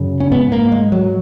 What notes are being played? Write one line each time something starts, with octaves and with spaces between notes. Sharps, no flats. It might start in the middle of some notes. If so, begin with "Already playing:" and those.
Already playing: F#2 C#3
C#4
G#2 B3
A#3
G#3
F#3